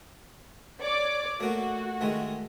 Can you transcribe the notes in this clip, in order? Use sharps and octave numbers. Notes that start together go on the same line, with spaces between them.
C#5 D5 D6
A3 A#3 F#4
D#3 G#3 A3